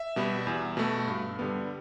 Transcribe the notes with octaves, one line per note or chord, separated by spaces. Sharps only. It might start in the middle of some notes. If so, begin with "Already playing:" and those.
Already playing: E5
B2 G3 B3
E2
B2 A3
G2
D3 G3 B3